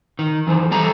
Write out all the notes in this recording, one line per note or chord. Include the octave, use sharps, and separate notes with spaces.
D#3
F2 E3 C5
G3 A4 A#5